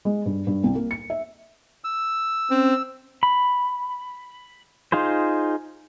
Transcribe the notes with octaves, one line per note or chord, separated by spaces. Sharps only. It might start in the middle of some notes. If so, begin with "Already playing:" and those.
G#3
G2
G2
C2
A#3
C#7
E5
E6
C4 C#4
B5
D#4 F4 G#4 C5